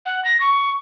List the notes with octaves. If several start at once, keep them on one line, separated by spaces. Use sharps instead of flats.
F#5
A#6
C#6